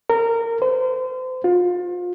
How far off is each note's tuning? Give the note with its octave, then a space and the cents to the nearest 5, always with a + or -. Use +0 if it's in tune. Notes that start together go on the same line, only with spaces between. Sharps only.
A#4 -20
C5 -35
F4 +30